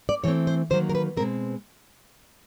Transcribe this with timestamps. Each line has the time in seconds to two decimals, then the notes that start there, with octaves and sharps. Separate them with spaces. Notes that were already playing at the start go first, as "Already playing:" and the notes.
0.09 D5
0.24 E3 A3 C4 C#5
0.47 C5
0.70 D#3 F#3 A#3 C5
0.89 A#4
0.95 B4
1.17 B2 G#3 C4 A#4